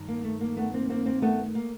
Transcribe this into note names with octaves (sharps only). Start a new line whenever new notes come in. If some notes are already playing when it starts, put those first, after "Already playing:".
Already playing: G2 D#3
A#3
A3
A#3
A3 B3
A#3 C4
A#3 C4
A#3 C4
A3 B3
A#3